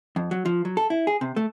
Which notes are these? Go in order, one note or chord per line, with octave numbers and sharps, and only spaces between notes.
F2
F#3
F3
F#3
A4
E4
G#4
C3
A3